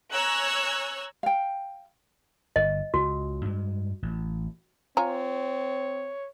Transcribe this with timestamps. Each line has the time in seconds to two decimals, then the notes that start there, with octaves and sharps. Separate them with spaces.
0.11 C#5 G#5 A#5 E6 F#6 G#6
1.23 F5 G5
2.56 G1 D#5
2.94 C#2 F#4
3.45 G2 G#3
4.02 A1
4.97 C4 F4 C#5 G#5 A#5